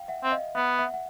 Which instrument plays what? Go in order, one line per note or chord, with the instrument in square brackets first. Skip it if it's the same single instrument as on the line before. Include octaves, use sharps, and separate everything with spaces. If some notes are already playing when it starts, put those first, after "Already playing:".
Already playing: [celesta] F5 G5
E5 F#5
[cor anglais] C4 [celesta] E5
[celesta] D#5 F5
[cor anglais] B3 [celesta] E5 F#5
[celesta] E5 F#5
F#5